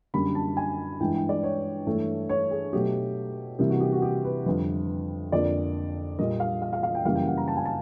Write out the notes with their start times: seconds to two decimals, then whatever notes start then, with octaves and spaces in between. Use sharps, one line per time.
0.14 F#2 D3 G3 A#3 B5
0.35 A5
0.57 G#5
1.00 G2 E3 G#3 G5
1.14 G5
1.29 D5
1.44 C#5
1.86 G2 E3 A3
2.29 C#5
2.51 G#4
2.73 B2 F#3 A3 G4
3.59 C3 E3 G3 A#3 G4
3.70 F#4
3.80 G4
3.92 F#4
4.02 G4
4.25 B4
4.45 F2 D3 G3 B4
5.32 F2 D3 F3 A#3 D5
6.18 A#2 G3 A#3 D#5
6.40 F5
6.62 F5
6.73 F5
6.83 F5
6.95 G5
7.05 F#2 C#3 E3 G3 A#3 F5
7.15 G5
7.27 F#5
7.37 A#5
7.48 A5
7.57 G#5
7.65 A5